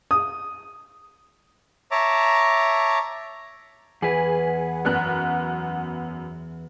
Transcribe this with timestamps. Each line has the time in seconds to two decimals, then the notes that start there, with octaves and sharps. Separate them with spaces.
0.11 D#6
1.91 C#5 E5 A5 A#5 D6
4.02 E2 G#4 B4 F#5
4.85 F#2 B3 F#6